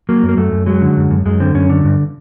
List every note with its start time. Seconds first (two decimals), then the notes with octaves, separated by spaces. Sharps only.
0.09 F#3 A#3
0.23 F#2
0.29 A#3
0.37 F#2 A3
0.52 F#2
0.66 F#3 G#3
0.82 D3
0.96 F#2
1.11 F#2
1.25 F#2 G#3
1.40 D3 C4
1.54 F#2 C#4
1.69 D3
1.84 G2